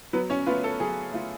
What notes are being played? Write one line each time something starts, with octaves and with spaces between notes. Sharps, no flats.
F#3 B3 B4
C#4 C#5
A3 B3 F4 B4
A4
F#3 G#4
A3 F4